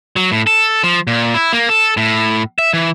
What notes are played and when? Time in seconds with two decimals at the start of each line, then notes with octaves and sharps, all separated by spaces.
0.16 F#3
0.32 A2
0.47 A4
0.83 F3
1.07 A#2
1.34 E4
1.53 A#3
1.69 A4
1.97 A2
2.59 E5
2.73 E3